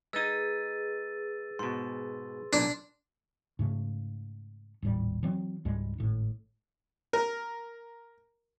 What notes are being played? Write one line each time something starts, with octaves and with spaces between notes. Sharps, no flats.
G#3 D#4 G#4 B4 E6 A6 D#7
G#2 B2 C6
B1 A#2 D4
G#2 C#3 A3
D#1 G#1 A2 G3
E3 F#3 C4
C#2 G#2 G3 G#3
G#1 A2
A#4